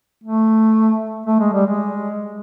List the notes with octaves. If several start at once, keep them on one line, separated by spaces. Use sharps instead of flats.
A3
A3
G#3
G3
G#3